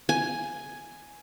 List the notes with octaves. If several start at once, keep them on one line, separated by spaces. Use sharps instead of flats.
G#5